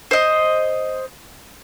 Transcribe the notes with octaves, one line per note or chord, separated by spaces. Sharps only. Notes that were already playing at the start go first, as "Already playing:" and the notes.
C5 D#5